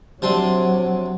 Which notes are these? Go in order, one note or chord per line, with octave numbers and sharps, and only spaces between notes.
C3 F#3 D4 C6